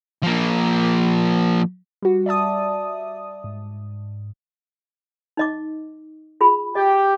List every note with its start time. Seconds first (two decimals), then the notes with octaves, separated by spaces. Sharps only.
0.23 F3 A#3
2.02 G3 F#4
2.26 D5 E5 A5 D#6
3.44 G#2
5.37 D#4 D#5 D6
6.41 F4 G#4 B5
6.75 G4 D#5